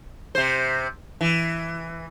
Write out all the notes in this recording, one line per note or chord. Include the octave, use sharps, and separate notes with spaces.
C3 C5
E3